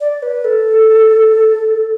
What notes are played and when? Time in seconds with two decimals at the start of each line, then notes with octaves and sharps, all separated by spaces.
0.01 D5
0.23 B4
0.45 A4